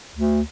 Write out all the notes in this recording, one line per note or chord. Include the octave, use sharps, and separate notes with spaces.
D2